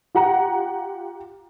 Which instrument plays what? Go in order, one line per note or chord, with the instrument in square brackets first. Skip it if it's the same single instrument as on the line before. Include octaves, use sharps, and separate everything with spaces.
[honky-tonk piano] F4 G4 F#5 A#5